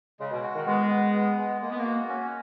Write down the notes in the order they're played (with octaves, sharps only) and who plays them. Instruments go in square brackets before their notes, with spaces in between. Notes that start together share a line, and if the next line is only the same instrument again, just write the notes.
[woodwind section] C#3 [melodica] G#3
[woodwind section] B2
[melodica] F#4
[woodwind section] D#3
[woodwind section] G#3 [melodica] B3
[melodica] B3
B3
G#3
[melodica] G#3 [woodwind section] A#3
[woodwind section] B3
A#3
[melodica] F#4
C#4